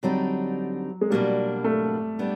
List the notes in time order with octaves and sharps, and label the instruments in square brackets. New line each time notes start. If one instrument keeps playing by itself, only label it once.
[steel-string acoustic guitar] D3 G3 C4 D#4 [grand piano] F#3
[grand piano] G#3
[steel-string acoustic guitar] B2 F#3 A#3 D4 [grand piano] G3
[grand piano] A3
[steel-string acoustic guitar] G3 B3 D4